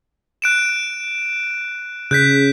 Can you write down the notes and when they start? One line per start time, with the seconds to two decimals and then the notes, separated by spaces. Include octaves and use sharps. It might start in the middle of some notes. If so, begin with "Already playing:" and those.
0.42 F#6 D7 E7
2.11 C#3 F#6 G6 B6